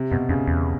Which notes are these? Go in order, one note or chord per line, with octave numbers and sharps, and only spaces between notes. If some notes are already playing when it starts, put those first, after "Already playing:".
Already playing: C3
F#2 B2
F2 C#3
E2